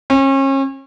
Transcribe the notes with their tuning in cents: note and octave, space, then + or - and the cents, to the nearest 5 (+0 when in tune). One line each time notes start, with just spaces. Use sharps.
C#4 -35